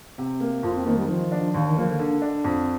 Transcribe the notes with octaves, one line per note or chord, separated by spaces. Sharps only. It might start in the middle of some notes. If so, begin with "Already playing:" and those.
C3
A#3
F2 F4
C4
D#3 A#3
G3
D#3 F3
D4
D#2 D#3
D#3
F3 A#3
D3
D3
D4
F2